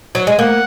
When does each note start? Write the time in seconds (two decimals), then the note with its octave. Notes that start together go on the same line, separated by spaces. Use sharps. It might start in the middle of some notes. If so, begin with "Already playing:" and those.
0.15 F#3
0.27 G#3 G#5
0.39 A#3 F#5